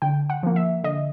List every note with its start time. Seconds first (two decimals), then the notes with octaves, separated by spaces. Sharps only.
0.02 D3 G5
0.30 F#5
0.43 F3 A#3
0.56 E5
0.84 D3 D#5